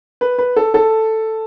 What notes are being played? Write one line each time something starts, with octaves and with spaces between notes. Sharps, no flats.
B4
B4
A4
A4